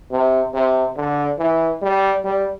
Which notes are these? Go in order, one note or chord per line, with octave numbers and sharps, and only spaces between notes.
C3
C3
D3
E3
G3
G3